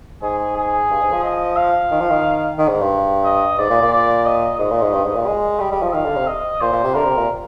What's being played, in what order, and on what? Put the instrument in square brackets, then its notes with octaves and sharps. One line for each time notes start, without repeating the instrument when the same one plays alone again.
[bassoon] G#2 [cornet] G#4
[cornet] G#4
[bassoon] G2
G#2
F3
[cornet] D#5
F5
[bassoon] D#3
F3
D#3
D#3
G#2
G2
[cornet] D#5
[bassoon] G#2 [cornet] D5
[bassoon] A#2
A#2
[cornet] D5
D#5
[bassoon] G#2 [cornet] D#5
[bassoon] A#2
G#2
G2
G#2
A#2
G#3
[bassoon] G3 [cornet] D#5
[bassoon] G3
F3
[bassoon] D#3 [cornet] F5
[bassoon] D3
C3
[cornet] D#5
[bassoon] A#2 [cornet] C5
[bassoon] A#2
C3
[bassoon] D3 [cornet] A#4
[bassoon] C3
A#2